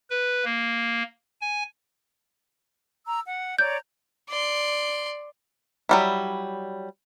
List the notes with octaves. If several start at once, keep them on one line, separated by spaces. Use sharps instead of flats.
B4
A#3
G#5
A#5 E6
F#5
C#5 D5 A#5 G6
D5 C6
F#3 G3 E4